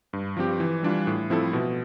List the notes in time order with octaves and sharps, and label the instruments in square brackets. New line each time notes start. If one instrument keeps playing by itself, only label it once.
[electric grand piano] G2
F3 C4 G4
E3
G3 D4 F4
A2
F3 C4 E4 A4
B2